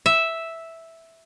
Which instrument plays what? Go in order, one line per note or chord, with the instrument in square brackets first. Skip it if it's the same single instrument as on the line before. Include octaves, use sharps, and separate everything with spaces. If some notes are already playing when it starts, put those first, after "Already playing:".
[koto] E5